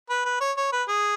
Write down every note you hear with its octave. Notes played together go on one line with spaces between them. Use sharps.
B4
B4
C#5
C#5
B4
G#4